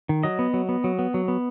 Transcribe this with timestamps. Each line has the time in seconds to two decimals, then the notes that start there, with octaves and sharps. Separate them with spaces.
0.09 D#3
0.23 F#3 D#5
0.39 B3
0.54 F#3
0.69 B3
0.84 F#3
0.99 B3
1.14 F#3
1.28 B3